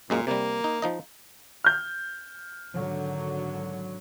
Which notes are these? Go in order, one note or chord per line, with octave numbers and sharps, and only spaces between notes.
F#2 A#2 G#3 A#3
C3 G3 A#3
D#4
F3 D#4 D#5
F6 G6
G#1 D3 F#3